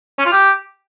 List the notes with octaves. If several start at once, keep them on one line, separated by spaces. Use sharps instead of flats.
C#4
F4
G4